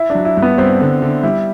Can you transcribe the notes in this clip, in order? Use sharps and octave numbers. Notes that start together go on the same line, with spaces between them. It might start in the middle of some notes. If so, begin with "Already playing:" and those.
Already playing: E4
F#3 D4
E4
G2
B3
G2 C4
D3
D3
G3 E4